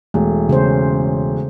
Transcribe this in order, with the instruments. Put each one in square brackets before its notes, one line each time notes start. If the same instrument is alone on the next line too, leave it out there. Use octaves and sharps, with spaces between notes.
[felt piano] E1 [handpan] A3
[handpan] C#3 C#4 C5